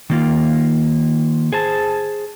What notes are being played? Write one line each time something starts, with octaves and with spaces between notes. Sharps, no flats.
D#3 A#3 F4
G#4 C5 A5